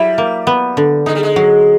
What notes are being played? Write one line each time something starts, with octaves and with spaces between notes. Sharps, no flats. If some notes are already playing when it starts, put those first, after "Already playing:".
Already playing: F#3 G3 E4
A#3
B3
D3
G#3 D#4
G3
G#3
F#3